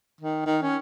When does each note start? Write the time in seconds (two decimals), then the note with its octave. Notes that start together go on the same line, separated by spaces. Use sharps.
0.21 D#3
0.46 D#3
0.62 C#4